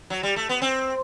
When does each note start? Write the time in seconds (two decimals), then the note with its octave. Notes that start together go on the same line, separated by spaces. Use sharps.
0.10 F#3
0.23 G3
0.36 A3
0.49 B3
0.62 C4